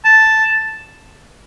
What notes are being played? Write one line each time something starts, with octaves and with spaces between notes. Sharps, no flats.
A5